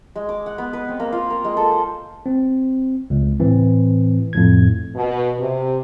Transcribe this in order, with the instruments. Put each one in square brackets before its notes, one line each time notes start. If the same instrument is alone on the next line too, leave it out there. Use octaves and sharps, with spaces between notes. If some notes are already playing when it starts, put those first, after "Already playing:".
[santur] G#3
D6
F#5
B3
B4
C4
A#3
F4
A#4
G#3
A4
C5
[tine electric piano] C4
C#2
A2 E3 C4
F2 A2 G#6
[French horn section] B2
C3